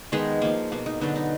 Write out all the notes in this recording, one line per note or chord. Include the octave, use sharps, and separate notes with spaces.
D#3 G#3 B3 G#4
F3 A#3
B2 A#3
D#4
D3 F#3 B3 D#4
D#4